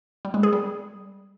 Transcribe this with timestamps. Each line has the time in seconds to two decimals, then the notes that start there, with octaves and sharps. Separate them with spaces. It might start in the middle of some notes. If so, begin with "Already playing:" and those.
0.25 G3
0.34 G#3
0.43 G#4
0.53 G3